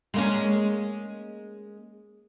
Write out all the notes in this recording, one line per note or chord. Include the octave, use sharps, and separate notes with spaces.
G#3 A#3 C#4